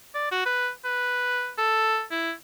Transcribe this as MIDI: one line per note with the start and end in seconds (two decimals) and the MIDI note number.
0.14 0.29 74
0.31 0.44 66
0.46 0.69 71
0.84 1.50 71
1.58 2.03 69
2.11 2.32 64